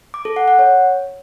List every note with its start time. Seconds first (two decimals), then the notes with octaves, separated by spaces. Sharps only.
0.14 D6
0.25 A4
0.36 F#5
0.48 F#5
0.59 C#5